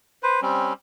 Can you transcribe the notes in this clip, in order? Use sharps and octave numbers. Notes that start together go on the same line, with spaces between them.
B4 C5
G3 C4 C#4